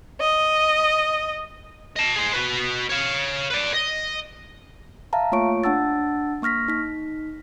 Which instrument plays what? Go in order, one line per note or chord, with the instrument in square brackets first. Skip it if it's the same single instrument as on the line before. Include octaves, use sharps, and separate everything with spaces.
[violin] D#5
[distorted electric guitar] D#5 A5
G#4 C5
F#4 B4
C#5 F5
B4 D5
D#5
[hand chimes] E5 F5 A5 A#5
A3 A#3 F4 C#5 C#6 D7
D4 F#5 A5 E6 A6
A#3 C#6 F6 A#6 B6
D#4 B6